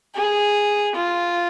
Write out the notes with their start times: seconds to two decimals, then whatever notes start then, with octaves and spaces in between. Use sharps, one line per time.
0.15 G#4
0.96 F4